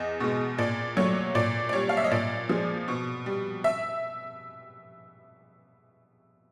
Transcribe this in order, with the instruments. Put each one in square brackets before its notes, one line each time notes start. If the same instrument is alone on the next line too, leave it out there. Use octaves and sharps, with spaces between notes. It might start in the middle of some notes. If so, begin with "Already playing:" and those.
Already playing: [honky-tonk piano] E2 D#5
B2 G#3
A#2 D5
F#3 A3 C#5
A#2 D5
D5
G3 C#5
F5
E5
D#5
A#2 D5
F3 G#3
B2
G3
E5